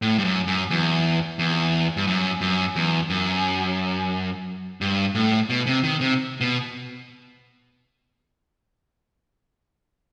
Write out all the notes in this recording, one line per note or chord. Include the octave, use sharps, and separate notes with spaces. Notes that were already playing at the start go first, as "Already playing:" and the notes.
A2
G2
F#2
F#2
E2
E2
G2
F#2
F#2
E2
F#2
G2
A2
B2
C3
D#3
C3
B2